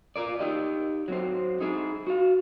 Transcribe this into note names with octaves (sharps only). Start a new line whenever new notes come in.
F4 A#4 D5
D#4 G4 D#5
F#3 C4 C5
D#4 E4 G#4
F#4 F5